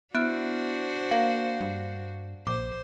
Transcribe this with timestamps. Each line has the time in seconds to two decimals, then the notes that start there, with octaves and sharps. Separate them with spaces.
0.15 B3 D4 E4 F#4 C5 F#6 D7
1.11 A#3 F5
1.61 G2
2.47 A#1 C5 D6